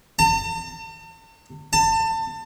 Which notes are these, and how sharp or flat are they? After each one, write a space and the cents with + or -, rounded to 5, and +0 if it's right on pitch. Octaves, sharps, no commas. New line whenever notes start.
A5 +45
A5 +30